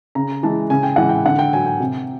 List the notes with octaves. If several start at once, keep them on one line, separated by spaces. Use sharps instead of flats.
C#3 A#5
E3 G#3 A5
C#3 G#5
G5
E3 G#3 F#5
G5
D3 F#5
G5
F#3 G#5
G5
C3